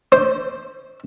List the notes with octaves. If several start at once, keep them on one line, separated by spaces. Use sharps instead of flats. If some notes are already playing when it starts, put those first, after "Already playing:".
C5